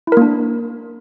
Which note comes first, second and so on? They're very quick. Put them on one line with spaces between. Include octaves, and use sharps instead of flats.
E4 A#4 A#3 D4